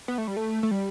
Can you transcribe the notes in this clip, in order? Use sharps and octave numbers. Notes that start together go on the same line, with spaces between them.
B3
A3
G3
A3
A3
G3